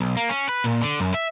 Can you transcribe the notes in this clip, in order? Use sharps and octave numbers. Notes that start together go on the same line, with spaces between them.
B1
A#3
C#4
B4
A#2
D3
F#2
E5